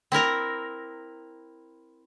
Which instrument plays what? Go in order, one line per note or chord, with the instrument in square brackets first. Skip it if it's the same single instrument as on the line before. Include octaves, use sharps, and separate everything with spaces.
[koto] C4 E4 A#4 A#5